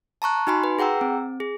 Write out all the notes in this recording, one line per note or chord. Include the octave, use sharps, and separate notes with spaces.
A5 A#5 C#6 F#6
D#4 F#4 G#5 B5 C6
B4
G#4 F#5 G5 A#5 E6
C4
G#4